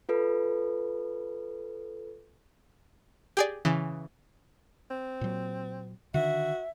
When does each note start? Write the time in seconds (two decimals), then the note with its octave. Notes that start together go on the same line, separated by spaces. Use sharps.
0.09 F4 A4 B4
3.37 G4 G#4 D5
3.65 C#3 E3
4.91 C4
5.21 A#2 F#3
6.14 D3 D#3 D4 F#4 E5